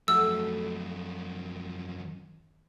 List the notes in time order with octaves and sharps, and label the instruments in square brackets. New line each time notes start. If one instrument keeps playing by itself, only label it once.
[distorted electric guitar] F#2 F3 [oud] A3 F#4 [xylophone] E6